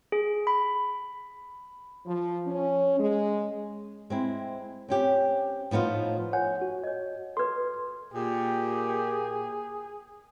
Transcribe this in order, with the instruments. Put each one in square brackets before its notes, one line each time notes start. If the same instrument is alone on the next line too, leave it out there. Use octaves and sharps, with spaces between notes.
[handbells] G#4
B5
[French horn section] F3
C#4
G#3
[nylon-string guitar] G#3 C4 E4
C4 C#4 G4
A2 F3 B3 D#4 F4
[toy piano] C#5 [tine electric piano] F#5 G#5
[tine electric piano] F#4
[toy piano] C#5 D#5
[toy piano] A4 B4 [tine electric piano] C6 G#6
[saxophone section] A#2 [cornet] G4 [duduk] G#4